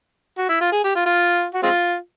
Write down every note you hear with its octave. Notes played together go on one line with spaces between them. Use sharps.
F#4
E4
F4
G#4
G4
F4
F4
F#4
G#3 C4 F4